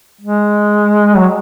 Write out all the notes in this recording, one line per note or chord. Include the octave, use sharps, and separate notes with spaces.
G#3
F#3